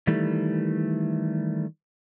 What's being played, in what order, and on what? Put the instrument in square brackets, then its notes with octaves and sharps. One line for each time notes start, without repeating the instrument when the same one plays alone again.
[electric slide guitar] D#3 E3 G3 A3